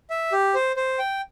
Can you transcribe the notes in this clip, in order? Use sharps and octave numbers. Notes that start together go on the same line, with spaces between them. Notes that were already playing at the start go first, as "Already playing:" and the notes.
E5
G4
C5
C5
G5